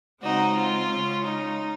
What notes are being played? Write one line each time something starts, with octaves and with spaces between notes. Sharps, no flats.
C#3 G#3 C4 D#4 F#4
F4
C#3 G#3 C#4
D#4